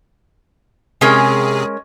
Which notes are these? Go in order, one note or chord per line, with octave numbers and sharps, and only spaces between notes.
C3 G#3 C#4 G#4 A#4